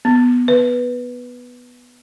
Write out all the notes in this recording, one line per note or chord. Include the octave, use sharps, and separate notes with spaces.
B3
B4